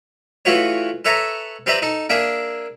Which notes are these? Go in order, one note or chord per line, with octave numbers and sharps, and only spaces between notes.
E3 A3 F4 F#4 B4 C#5
A4 B4 C#5 E5 A5 A#5
C4 G4 B4 D5 E5 A#5
D#4 A4
A#3 D4 G#4 E5